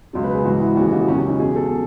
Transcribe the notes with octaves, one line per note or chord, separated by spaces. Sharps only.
C#2 B2 F#3
B4
G#4
G#2 E3 F#4
E4
D#2 C#3 E3 F#4
D#4
C#2 B2 F#3 C#4
C#4
D#4
E2 B2 F#3 G#4
A4